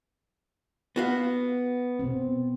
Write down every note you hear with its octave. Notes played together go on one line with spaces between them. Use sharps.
B3 F#4 F5
B2 C4